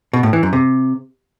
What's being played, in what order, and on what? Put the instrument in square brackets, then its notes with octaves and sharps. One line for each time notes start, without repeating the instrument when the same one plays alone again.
[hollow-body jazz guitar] B2
A2
E3
F#2
C3